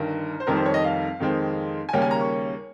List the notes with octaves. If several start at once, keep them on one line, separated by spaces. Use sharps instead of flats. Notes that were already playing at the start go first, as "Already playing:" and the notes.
Already playing: G1 G2 D#3 A#4
C5
F1 F2 D#3 G3 A#4
C5
C#5
D#5
F5
F2 D#3 G#3 C4
G#5
D#2 C#3 G3 A#3 C#4 G5
G#5
A#5
C#6